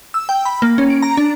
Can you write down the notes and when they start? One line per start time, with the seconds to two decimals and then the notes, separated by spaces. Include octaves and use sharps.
0.14 E6
0.29 G5
0.45 B5
0.62 A#3
0.78 C#4
0.90 D7
1.02 A#5
1.17 D4